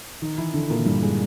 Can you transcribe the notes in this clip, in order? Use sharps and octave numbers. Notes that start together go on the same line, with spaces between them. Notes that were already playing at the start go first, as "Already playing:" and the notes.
D#3 D#4
E3 E4
D3 D4
A#2 A#3
G2 G3
G#3